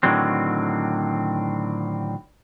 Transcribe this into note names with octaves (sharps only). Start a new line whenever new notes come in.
A2 D3 D#3 F#3 C4